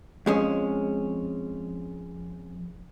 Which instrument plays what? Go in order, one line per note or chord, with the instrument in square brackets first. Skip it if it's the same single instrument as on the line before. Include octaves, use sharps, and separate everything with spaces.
[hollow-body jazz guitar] F2 G#3 C#4